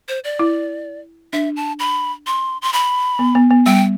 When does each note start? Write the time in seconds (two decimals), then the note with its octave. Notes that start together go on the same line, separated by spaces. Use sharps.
0.08 C5
0.24 D5
0.39 E4
1.33 D4 E5
1.56 A5
1.79 B5
2.27 C6
2.62 C6
2.73 B5
3.19 B3
3.35 B3
3.51 B3
3.66 G3 G5